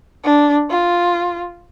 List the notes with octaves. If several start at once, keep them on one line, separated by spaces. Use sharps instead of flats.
D4
F4